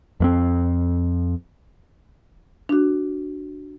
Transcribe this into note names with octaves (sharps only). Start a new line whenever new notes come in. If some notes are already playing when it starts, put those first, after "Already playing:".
F2 A#3 C4
D4 F#4